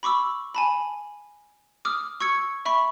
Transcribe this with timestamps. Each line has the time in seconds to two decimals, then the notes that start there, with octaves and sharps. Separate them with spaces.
0.03 B5 C#6 D6 E6
0.55 G#5 A5 B5
1.85 D6 D#6 F6
2.20 C#6 E6 G#6 C#7
2.65 E5 B5 C#6